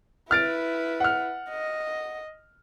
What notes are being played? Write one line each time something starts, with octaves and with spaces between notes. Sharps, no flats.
E4 B4 F6 A6 D7
F#5 F6
D#5